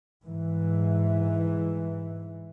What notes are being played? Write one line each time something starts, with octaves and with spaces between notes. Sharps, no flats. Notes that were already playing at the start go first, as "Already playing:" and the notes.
G#2 E3